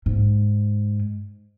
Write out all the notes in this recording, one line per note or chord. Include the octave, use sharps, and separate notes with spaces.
G#2